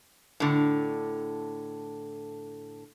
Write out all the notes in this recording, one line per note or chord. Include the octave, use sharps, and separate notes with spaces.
A2 D3